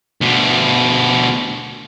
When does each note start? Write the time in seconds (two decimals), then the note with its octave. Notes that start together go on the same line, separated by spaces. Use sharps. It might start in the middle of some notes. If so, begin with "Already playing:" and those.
0.21 D2 B2